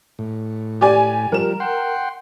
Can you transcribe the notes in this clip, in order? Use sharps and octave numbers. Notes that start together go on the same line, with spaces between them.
A2
G4 D5 G#5
F3 G3 A#4 E7
F#5 G5 C6